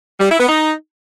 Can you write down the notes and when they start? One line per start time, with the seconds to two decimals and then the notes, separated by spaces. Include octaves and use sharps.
0.20 G3
0.29 E4
0.39 B3
0.48 D#4